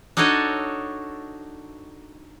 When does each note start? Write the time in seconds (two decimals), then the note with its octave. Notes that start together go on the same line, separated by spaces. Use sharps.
0.17 D4 D#4 F#4 A4 C#5 D#5